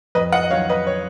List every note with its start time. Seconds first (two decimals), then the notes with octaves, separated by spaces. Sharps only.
0.15 F2 B4 D#5
0.32 D#5 F#5
0.43 D#5
0.51 D#3 F#3 C#5 F5
0.69 B4 D#5
0.87 C#5